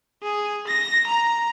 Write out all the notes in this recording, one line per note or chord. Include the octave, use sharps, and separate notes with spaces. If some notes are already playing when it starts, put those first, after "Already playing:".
G#4
A#6
A#5